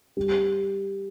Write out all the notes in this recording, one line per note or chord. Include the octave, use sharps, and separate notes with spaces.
G3